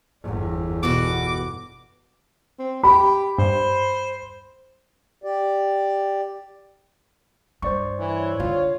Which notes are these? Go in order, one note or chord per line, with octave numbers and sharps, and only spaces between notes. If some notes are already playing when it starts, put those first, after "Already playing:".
G1 E2
B2 F#4 D6
C4
G4 B5
G2 C5
G4 D5
G2 C5 D5 C#6
E3 C#5
D3 F4